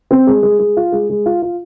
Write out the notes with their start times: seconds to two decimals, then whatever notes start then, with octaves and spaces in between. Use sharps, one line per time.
0.11 C4
0.27 G#3
0.43 G#3
0.59 G#3
0.77 F4
0.92 G#3
1.10 G#3
1.26 F4
1.42 F4